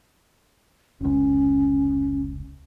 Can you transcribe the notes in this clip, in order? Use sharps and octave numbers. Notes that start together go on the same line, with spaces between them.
F1 C#2 C#4